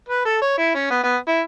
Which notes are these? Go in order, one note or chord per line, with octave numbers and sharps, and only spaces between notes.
B4
A4
C#5
E4
C#4
B3
B3
E4